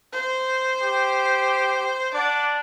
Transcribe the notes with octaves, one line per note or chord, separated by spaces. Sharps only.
C5
G4
D4 D5 F#5